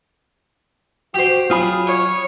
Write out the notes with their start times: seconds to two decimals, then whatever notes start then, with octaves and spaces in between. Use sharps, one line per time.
1.14 F#4 G4 C5
1.51 F#3 F4 G#4 B5
1.89 C#5